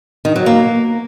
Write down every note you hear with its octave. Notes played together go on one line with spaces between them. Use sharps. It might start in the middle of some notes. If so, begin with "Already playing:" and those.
D#3
F#3
A#3